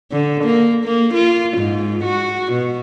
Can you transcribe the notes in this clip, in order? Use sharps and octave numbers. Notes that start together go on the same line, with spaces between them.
D3
A#3
A#3
F4
G#2
F#4
B2